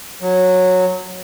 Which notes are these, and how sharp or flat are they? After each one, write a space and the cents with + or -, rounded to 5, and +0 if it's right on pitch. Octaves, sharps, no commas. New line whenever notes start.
F#3 -10